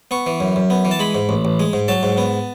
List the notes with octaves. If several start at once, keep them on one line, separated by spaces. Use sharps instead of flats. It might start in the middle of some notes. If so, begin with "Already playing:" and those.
B3 C#6
E3
F#2
F#2
B3
E3
A5
G#3 B5
G#2
A1
A1
G#3
G#2
F#3 A5
G#2
B3